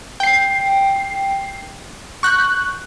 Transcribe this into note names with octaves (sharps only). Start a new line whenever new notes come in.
G5 C7
C#6 F#6 G6